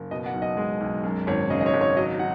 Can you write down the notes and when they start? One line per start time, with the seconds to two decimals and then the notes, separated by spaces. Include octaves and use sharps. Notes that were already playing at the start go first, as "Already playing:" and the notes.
Already playing: F#1
0.11 B2 D#5
0.26 F#5
0.34 B1
0.42 D#5
0.57 G#3
0.81 B1
1.04 F#2
1.27 G#1 C#5
1.50 C#3 D#5
1.60 D#5
1.66 C#5
1.73 G#1
1.81 C#5
1.97 F#3 D#5
2.19 F#3 F#5